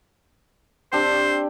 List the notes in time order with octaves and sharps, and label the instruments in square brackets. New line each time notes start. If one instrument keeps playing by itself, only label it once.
[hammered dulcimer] C4 D4 G4 [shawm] C5